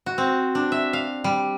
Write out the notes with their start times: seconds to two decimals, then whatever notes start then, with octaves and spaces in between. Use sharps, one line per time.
0.06 F#4
0.18 C4
0.55 D4
0.72 E5
0.93 F5
1.24 G3